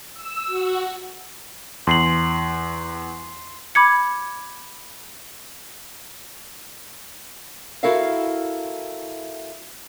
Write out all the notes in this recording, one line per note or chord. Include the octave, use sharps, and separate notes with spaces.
E6
F#4
E2 C6 C7 F#7
B5 D6 G#6 C#7
E4 F#4 A4 A#4 E5 F5